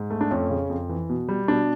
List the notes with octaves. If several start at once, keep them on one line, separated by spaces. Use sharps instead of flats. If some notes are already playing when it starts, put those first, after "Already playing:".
Already playing: G#2
A3
D4
F2 C#4
C#3
F2
E3
B2
G3
B2 D4